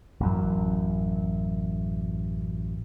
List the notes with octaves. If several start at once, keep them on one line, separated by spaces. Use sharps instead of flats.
A1 F#2